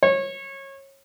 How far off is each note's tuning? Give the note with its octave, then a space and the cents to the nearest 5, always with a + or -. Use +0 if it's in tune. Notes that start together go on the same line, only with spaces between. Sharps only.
C#5 -25